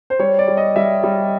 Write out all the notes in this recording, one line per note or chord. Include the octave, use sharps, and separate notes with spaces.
C5
G3 C#5
D5
G3
D#5
G3 E5
G3